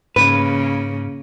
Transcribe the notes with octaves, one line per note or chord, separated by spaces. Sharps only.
G#2 C#3 A#3 B4